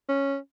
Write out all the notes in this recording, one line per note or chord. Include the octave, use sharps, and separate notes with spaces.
C#4